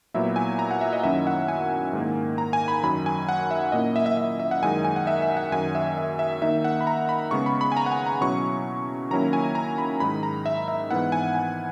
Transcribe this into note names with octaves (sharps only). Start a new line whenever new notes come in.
A#2 F#3 B3 E4 E5
G#5
A#5
F#5
E5
D#5
F#2 D#3 F#3 C#4 E4 E5
F#5
G#5
G#2 D#3 A#3
A#5
G#5
B5
F#2 D#3 F#3 B5
G#5
F#5
E5
A#2 A#3 C#4 E4 D#5
E5
E5
E5
E5
F#5
F#2 D#3 G#3 D#4 G#5
G#5
F#5
E5
E5
F#5
F#2 D#3 F#3 G#5
E5
E5
E5
D#3 A#3 D#4 E5
F#5
B5
A#5
B5
C#3 G#3 B3 C#6
B5
B5
G#5
A#5
F#5
G#5
A#5
B2 F#3 C#4 E4 C#6
D#3 F#3 A#3 C#4 E4 A#5
G#5
A#5
B5
G#2 D#3 G#3 D#4 B5
A#5
E5
E5
G#2 E3 B3 E4 F#5
G#5
G#5